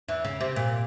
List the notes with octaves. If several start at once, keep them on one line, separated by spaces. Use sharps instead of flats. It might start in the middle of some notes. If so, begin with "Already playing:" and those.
E2 E3
C#3
C3
A#2